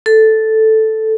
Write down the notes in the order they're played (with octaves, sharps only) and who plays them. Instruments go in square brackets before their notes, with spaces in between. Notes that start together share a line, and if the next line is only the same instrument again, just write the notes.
[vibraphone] A4